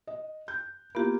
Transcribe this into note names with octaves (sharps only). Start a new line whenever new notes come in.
D#5
G6
A#3 B3 F4 G4